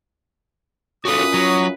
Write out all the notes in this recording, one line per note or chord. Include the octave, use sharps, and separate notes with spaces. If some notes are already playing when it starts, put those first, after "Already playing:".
F#2 C#4 F4 F#4 A4 B4 D#6
F#3